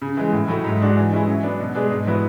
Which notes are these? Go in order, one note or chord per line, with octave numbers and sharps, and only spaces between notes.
C#3
E3 G#3
A2
F#3 A3 E4
G#2
G#3 D4 F#4
E3
G#3 C#4 E4
F#3
B3 D4
B2
G#3 D4 G#4 B4
G#2
F#3 B3 E4 B4